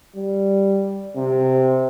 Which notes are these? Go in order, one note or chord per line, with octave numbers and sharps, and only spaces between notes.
G3
C3